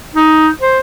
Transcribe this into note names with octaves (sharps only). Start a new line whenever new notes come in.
D#4
C5